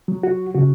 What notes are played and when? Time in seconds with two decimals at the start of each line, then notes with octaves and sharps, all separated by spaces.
0.08 F#3
0.23 F#4
0.55 C#3 F#4